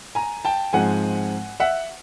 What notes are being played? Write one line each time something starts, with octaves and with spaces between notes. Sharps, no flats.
G#5 A#5
G5 A5
G#2 F3 G#3 C4 F#5 G#5
E5 F#5